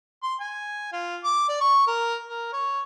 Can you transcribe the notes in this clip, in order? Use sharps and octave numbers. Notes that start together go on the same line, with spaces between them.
C6
G#5
F4
D6
D5
C#6
A#4
A#4
C#5